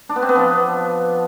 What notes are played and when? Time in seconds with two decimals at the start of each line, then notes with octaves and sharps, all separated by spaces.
0.09 D4
0.16 B3
0.22 C4
0.29 B3
0.35 F3